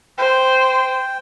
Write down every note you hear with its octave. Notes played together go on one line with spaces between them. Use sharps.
C5 G5